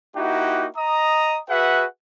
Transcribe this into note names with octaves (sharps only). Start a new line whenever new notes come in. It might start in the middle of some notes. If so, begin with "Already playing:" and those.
A#3 D#4 E4 F#4 G4 F#5
D#5 A#5 D#6
F#4 G#4 B4 E5 F#5